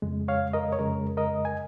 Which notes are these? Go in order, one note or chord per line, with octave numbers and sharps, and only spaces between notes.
F2 C#3 G#3
C#5 F5
A#4 D#5
C#5
F2 C#3 G#3 A#4
A#4 D#5
G#5